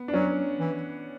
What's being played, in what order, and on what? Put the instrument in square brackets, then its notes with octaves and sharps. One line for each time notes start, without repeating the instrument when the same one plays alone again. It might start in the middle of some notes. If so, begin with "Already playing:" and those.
Already playing: [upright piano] B3
D4
[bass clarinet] F#3 [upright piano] C#4
[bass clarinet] E3